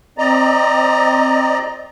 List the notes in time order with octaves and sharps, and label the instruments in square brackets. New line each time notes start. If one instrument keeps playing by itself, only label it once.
[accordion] C4 D5 D#5 A#5